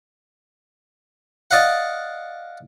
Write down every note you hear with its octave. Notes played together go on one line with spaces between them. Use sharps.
D5 D#5 F5 F#5